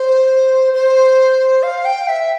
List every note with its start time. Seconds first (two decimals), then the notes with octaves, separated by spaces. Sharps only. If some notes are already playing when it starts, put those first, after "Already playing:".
Already playing: C5
0.74 C5
1.63 F5
1.85 G5
2.08 E5